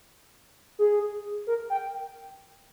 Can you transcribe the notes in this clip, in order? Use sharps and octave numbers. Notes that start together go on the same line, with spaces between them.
G#4
A#4
G5